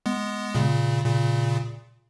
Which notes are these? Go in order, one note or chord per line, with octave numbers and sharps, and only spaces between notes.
G#3 B3
A#2 C#3
A#2 C#3